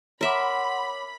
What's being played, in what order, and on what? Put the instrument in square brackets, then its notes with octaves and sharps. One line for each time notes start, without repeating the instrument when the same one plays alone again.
[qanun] A#4 E5 [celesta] C#5 D6 [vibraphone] F#5 C6 [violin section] B5